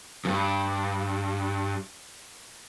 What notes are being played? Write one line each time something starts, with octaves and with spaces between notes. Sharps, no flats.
E2 G2